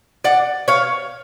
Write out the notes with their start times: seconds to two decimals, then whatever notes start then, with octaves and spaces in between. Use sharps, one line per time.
0.24 D5 F#5
0.68 C#5 F5